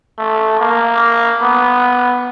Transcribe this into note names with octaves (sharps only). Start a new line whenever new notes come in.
A3
A#3
B3